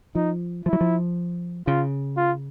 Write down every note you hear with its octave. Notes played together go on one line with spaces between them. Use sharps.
F3 D#4
F3 E4
F#3
F3
C#3 F4
F4